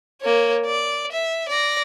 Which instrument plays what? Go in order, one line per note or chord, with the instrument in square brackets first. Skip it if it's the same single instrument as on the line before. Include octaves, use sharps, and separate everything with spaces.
[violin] A#3 C#5
D5
E5
D5 A#6